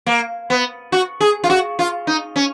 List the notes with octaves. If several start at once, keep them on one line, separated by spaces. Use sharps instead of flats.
A#3
B3
F#4
G#4
F4
F#4
F4
D#4
C#4